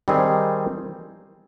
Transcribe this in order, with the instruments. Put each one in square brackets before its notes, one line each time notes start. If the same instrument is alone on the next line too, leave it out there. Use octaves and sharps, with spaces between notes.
[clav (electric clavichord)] D#3 G3 C4 D#4 G#4